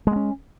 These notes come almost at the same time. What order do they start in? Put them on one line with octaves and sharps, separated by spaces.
G#3 A#3 C#4